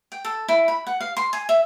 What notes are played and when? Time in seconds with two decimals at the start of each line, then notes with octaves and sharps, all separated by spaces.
0.12 G5
0.25 A4
0.48 E4
0.68 B5
0.87 F#5
1.00 F5
1.17 C6
1.33 G#5
1.49 E5